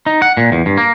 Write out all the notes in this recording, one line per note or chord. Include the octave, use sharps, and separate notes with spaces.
D#4
F#5
A#2
E2
G2
A#3